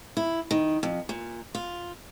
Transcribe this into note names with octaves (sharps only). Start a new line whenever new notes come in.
E4
D#3
F2
A#2
F4